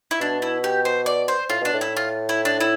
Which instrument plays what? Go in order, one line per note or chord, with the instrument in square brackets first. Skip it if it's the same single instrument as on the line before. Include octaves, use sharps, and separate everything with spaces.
[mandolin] E4
[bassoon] B2 [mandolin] D4
[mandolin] E4
G4
C5
D5
C5
[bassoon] A2 [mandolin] F4
[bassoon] B2 [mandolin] D4
[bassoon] A2
[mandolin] E4
F4
E4
D4
E4